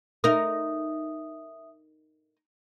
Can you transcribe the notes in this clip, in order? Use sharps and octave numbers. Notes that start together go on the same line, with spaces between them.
D#4 A#4 E5 D#6